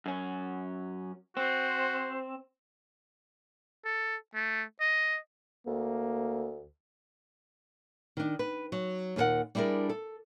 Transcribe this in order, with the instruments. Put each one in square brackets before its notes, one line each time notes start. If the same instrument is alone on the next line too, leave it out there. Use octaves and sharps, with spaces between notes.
[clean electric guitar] F#2 C#4
[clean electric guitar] C4 [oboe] F#4 [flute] C5
[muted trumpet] A4
A3
D#5
[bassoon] D2 [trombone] A#3
[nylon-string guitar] D#3 D4
B4
F#3
D#2 A#2 G#4 A#4 F#5
G3 D4 E4 G#4 A#4
A4